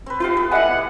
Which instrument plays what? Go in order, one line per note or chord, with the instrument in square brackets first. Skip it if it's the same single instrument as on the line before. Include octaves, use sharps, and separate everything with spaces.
[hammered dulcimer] C4 B4
[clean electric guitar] F4 G4 [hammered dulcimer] B4 C5 F5
[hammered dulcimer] B3
[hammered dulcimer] G3 E4 [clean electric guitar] D#5 E5 G#5 [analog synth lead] F#5
[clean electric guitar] B2